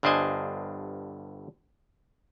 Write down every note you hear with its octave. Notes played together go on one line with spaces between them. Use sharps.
G1 G2 D4 C5 D#5 G#5